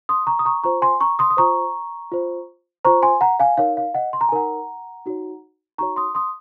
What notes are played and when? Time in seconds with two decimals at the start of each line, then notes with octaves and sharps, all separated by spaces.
0.09 C6 D#6
0.27 A#5 C#6
0.39 D#6
0.45 A#5 C#6
0.63 F4 C5 A#5 C#6
0.82 G#5 C6
1.01 A#5 C#6
1.19 C6 D#6
1.30 D#6
1.37 F4 C5 A#5 C#6
2.12 F4 C5
2.85 F4 C5 A#5 C#6
3.02 G#5 C6
3.21 F#5 A#5
3.40 F5 G#5
3.57 D#4 A#4 C#5 F5
3.77 F5
3.94 D#5 F#5
4.13 C6
4.21 A#5
4.29 G#5
4.32 D#4 A#4 C#5 F#5 A#5
5.06 D#4 F#4 C#5
5.78 D#4 F#4 C#5 A#5 C#6
5.96 C6 D#6
6.15 C6 D#6